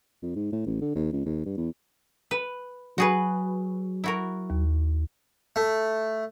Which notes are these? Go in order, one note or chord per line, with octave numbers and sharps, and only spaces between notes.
F2
G#2
A2
A1
D3
D#2
C#2
D#2
G2
E2
B4
F#3 F#4 G#4 B4
E4 F#4 A#4
D#2
A3